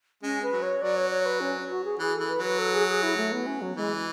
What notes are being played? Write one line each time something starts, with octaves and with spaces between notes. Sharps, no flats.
G#3 C#4
B4
F#3
C#5
F#3 D5
C#5
C#5
B4
C#4
F#4
G#4
E3 G#4
E3 A4
B4
F#3
B4
A4
G#4
G#4
E4
A3
B3
C#4
F#3
E3 G#3